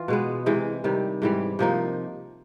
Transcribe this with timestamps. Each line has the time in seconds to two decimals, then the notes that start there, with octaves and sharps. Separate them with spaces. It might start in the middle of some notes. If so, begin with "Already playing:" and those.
Already playing: E3 F4
0.08 B2 G#3 B3
0.46 C3 E3 G#3
0.84 C3 D#3 G3
1.22 G#2 E3 G3
1.59 C3 F3 A#3 D#4